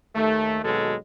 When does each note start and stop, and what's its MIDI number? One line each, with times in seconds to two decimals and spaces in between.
0.15 0.60 39
0.15 0.60 57
0.64 0.95 39
0.64 0.95 47
0.64 0.95 54
0.64 0.95 56
0.64 0.95 69